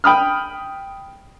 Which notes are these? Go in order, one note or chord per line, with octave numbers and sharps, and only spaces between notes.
G5 B5 D#6 F6